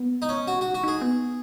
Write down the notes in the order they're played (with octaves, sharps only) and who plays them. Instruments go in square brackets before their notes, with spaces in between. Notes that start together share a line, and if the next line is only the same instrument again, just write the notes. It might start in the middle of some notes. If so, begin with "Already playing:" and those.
Already playing: [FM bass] B3
[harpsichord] D#4
C#4
[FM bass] C#4 [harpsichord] F#4
[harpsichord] F#4
[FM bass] D#4
[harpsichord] F#4
[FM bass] D#4 [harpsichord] G#4
[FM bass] B3